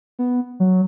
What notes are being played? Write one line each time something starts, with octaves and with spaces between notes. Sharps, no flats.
B3
F#3